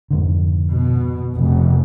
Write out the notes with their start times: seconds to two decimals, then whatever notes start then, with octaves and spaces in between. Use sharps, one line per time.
0.10 F2 G#2 D3
0.71 B2
1.35 F1